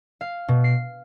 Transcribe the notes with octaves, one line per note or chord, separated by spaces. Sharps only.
F5
B2
C7